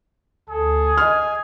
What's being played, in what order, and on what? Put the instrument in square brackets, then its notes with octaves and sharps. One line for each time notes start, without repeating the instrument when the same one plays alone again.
[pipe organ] D2 A4 [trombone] G#4
[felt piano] D#5 F6 [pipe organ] G#5